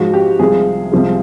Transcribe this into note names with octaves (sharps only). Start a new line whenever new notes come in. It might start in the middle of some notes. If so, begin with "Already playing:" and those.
Already playing: G#2 F3 G#3 F#4
G4
C2 C3 F3 G#3 G#4
C2 C3 F3 G#3